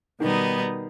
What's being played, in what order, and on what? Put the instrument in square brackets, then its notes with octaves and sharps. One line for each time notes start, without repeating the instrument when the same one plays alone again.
[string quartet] B2 G3 B3 D#4 [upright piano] D#3